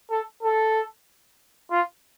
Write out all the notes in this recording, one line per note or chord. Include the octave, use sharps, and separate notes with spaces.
A4
A4
F4